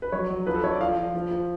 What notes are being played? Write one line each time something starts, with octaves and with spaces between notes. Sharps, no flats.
B4
F#3 C#5
F#3
F3 B4
A4
F3 C#5
D5
F3 F5
F3
F3
F3